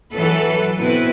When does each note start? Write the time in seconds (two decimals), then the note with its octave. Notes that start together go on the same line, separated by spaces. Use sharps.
0.13 E3 F#3 A4 B4
0.78 B2 C4 E4 B4